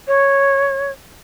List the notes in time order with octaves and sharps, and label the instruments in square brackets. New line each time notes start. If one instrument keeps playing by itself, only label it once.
[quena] C#5